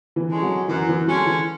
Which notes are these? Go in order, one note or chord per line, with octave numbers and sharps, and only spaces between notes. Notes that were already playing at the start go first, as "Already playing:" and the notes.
E3
D3 G#3 C#4
F#3
F#2 E3
E3
D3 F#3 G#3 C#4
E3